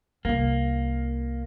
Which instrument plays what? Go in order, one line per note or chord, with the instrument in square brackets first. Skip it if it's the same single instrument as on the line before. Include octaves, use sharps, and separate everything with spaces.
[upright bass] C2 C#4 [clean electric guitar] A#3